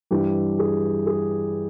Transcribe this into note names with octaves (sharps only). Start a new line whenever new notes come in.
G2 E3 G4
G#4
G#4